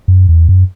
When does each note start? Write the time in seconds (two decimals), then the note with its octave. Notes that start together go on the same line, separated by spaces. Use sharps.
0.08 F#2
0.29 E2
0.49 F#2